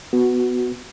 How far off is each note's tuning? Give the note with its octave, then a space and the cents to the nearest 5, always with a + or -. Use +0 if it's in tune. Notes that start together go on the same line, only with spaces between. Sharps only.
B3 +10 F#4 +0